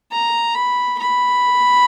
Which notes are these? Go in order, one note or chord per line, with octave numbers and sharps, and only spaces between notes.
A#5
B5
B5